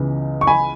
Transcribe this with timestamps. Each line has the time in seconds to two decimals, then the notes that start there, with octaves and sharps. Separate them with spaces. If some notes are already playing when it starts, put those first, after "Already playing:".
Already playing: C#2 C#3 E3 B3
0.41 C#6
0.47 G#5 B5